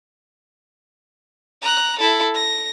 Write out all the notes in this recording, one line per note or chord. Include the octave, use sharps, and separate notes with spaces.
A#5 F#6
E4 A4
A#6